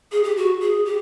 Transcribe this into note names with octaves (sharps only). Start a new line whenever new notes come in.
G#4
G4
F#4
G#4
G4